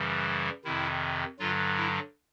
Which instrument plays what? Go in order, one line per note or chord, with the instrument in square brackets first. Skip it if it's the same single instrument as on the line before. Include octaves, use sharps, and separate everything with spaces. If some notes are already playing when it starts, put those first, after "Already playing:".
Already playing: [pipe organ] F#2 C#3 E3 G3
F2 C3 D#3 E4
G2 D3 F#3 F4
E4